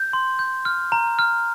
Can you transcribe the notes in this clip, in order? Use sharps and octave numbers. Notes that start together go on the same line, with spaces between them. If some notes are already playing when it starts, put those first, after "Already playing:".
Already playing: G6
C6
G6
F6
A#5
F6